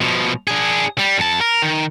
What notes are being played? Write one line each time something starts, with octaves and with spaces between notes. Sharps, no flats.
B2 F3
D4 G#4
G3
F2 A5
A#4
D#3